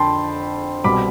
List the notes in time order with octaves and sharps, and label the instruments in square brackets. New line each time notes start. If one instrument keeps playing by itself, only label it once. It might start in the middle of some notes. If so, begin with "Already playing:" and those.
Already playing: [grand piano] F2 D3 G5 A5 B5 C6
C2 B2 G3 B5 D6